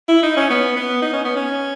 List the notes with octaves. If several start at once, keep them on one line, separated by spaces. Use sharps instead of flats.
E4
D#4
C#4
B3
B3
D#4
C#4
B3
C#4